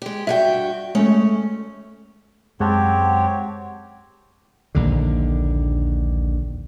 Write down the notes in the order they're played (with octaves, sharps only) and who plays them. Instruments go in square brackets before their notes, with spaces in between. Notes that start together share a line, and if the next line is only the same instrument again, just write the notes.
[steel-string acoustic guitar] G#3 G4
[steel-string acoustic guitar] G2 F#4 G5 [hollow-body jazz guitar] E5
[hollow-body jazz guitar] G#3 A3 [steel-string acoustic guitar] C#4
[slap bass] F#2 [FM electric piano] G#3 F#5 A5 [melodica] C4 G4 C#5
[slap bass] A#1 D#2 D3